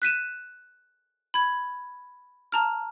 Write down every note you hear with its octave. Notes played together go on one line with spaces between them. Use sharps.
F#6 B6 D#7 E7
B5 G#6
A5 A#5 F6